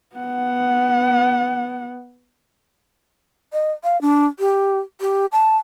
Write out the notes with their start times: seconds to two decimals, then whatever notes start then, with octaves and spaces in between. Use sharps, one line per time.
0.16 B3 F#5
3.53 D#5
3.84 F5
4.01 D4
4.39 G4
5.01 G4
5.32 A5